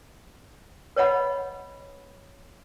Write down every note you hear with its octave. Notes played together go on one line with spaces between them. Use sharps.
B4 C#5 D#5 F#5 B5